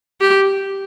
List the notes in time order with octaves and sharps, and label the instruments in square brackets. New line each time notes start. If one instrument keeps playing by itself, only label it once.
[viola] G4